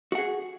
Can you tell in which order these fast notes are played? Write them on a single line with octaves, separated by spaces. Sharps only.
F#4 F#5 G#4